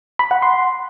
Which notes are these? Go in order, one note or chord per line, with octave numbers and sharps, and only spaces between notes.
B5
F#5
C6